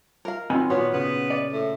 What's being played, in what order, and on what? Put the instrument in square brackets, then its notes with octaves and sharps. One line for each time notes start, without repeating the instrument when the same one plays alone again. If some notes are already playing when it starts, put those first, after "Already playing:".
[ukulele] A#4 F5
[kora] D#3 F#3 F4 [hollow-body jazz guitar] C4 G#5 B5
[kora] A#2 A#3 [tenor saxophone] B3 [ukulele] F#4 C#5 [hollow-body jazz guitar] C6
[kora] C#3 [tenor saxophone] B3
[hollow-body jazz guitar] D5
[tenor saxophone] A2